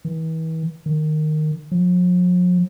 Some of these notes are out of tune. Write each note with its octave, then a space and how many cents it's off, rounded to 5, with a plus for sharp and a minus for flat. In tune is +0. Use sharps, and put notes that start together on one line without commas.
E3 -40
D#3 -15
F3 +45